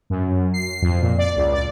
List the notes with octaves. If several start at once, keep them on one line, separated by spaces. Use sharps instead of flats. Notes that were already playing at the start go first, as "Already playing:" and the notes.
F#2
C7
F2
A#2
D5
C#2
D5